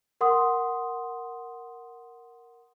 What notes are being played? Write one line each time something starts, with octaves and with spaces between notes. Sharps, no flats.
A#4 F#5 C6 D#6